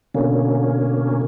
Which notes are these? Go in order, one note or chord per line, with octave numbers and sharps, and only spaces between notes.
B2 D3 A#3 C#4